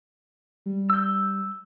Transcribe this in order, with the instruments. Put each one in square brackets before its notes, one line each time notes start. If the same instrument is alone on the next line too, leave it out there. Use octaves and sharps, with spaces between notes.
[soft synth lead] G3
[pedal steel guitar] E6 G6